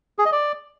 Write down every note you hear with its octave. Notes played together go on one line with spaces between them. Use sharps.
G#4
D#5
D5